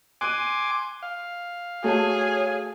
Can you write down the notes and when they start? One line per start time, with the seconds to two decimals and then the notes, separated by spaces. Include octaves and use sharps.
0.21 G#5 C6 D6 F#6 D#7
1.03 F5
1.84 A3 F#4 G#4 A4 C#5